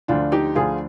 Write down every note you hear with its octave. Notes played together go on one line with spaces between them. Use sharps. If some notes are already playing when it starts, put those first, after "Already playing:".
D2 D3 F3 D4 F4
D#4 G4
D2 D3 F3 F4 G#4